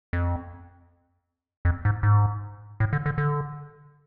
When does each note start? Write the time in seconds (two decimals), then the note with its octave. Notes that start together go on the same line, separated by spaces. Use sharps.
0.13 F2
1.65 F2
1.85 G#2
2.03 G#2
2.80 A2
2.93 D3
3.06 D3
3.18 D3